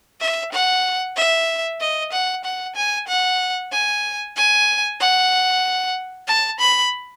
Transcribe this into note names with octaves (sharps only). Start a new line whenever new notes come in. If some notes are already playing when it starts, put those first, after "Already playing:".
E5
F#5
E5
D#5
F#5
F#5
G#5
F#5
G#5
G#5
F#5
A5
B5